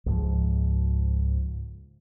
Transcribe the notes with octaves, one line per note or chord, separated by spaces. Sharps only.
C#2 G#2 F3